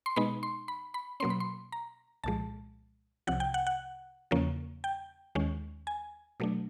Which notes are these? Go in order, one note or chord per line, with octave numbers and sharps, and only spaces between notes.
C6
B2 G#3 B3 D#4 B5
C6
B5
B5
B2 F#3 A#3 C#4 C6
B5
C6
A#5
C2 A#2 F3 G#3 A5
C2 C3 F3 F#5
G5
F#5
F#5
E2 C#3 F3 A#3 C#4
G5
D#2 D#3 G#3 C#4
G#5
B2 F#3 A3 D4